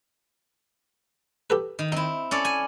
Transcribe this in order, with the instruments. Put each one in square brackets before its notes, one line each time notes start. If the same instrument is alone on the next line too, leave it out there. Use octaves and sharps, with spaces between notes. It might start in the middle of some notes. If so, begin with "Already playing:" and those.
[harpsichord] G4 A4 B4
[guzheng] D#3
[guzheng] C4 E4 [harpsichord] D#4
[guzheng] C#4 A4 D5
G#5